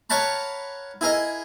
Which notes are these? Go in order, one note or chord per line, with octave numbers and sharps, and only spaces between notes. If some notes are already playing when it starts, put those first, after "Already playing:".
A#4 C#5 F5 F#5 A5 B5
E4 G#4 A#4 D#5